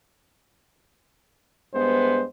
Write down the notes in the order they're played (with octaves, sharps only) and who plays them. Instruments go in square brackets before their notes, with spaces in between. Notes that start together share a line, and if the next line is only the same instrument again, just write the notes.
[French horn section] G2 G#3 B3 [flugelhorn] C5